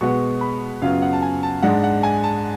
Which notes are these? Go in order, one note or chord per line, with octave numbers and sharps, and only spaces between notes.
B2 G#3 B3 C#6
B5
F#2 C#3 F#3 B3 F4 F5
F#5
A5
G#5
A5
G#2 G#3 D4 F#5
F#5
G#5
A5